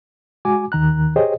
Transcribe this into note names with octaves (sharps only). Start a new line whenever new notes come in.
G#3 F#4 G#5 D6
D#2 D#3 A#5 F#6
G4 G#4 C5 C#5 D#5 G5